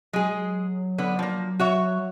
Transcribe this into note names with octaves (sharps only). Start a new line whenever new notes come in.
F#3 G#3 G#4
D3 B3
F3 A#3
F#4 C#5 E5